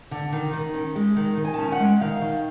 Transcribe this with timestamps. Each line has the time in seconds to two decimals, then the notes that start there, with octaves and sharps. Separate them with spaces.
0.11 D3
0.32 D#3
0.53 D#3
0.74 C#4
0.96 G#3
1.16 D#3
1.37 D#3
1.45 G#5
1.54 A5
1.58 C#4 G#5
1.72 F#5
1.80 G#3
2.01 D#3 F5
2.21 D#3